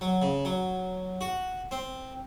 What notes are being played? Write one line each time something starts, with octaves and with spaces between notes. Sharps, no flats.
F#3
C#3
F#3
F#4
C4